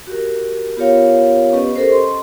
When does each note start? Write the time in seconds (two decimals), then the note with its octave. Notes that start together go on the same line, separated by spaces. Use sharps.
0.07 F#4 G4 A#4
0.77 B3 F4 G4 A#4 C#5 F5
1.53 B3 C#4 G4 B4 D#5
1.76 G4 A4 A#4 C5
1.88 C#4 D#5 C6